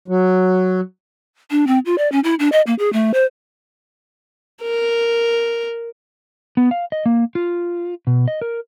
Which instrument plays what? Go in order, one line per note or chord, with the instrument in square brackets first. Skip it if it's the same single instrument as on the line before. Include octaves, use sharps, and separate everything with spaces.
[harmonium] F#3
[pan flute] D4
C4
F4
D5
C#4
E4
D4
D#5
A#3
G#4
A3
C5
[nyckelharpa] A#4
[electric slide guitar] B3
F5
D#5
A#3
F4
B2
D#5
A#4